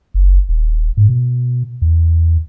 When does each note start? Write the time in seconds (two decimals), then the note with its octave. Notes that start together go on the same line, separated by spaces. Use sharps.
0.14 F#1
0.49 D#1
0.97 G#2
1.09 B2
1.82 E2